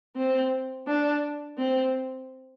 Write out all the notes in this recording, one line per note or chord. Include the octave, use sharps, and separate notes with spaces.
C4
D4
C4